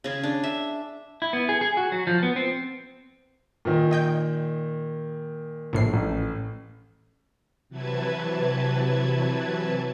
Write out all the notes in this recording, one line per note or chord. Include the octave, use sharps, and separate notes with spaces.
C#3 G#4
D4
E5
E4
B3
G#4
G#4
F#4
F#3
F3
B3
C4
A#2 D#3
D#5 G5 G6
A#1 A2 C7
A1
C3 E3 F#3 B4 A5 G#6